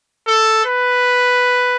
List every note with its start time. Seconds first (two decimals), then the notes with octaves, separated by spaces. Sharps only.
0.27 A4
0.65 B4